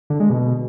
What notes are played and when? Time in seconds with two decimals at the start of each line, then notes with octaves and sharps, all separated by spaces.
0.10 D3
0.20 G#3
0.30 B2